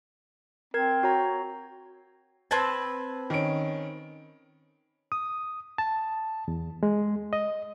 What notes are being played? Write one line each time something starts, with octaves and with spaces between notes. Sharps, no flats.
C4 A#4 G#6
F#4 C#5 A#5
C4 B4 A5 G#6
D#3 C#4 D7
D#6
A5
E2
G#3
D#5